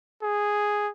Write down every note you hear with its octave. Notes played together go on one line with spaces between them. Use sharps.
G#4